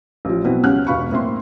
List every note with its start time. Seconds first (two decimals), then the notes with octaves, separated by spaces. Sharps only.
0.25 A1 F3
0.44 B2 F#3 B3 C4 E4 B4
0.63 C#2 C#4 G4 F#5 F6 F#6
0.87 E1 B2 F5 B5 C#6
1.10 A2 A#3 C4 E5 C6